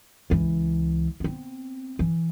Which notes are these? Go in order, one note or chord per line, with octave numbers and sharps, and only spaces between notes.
C#2 E3
B3 C4
E3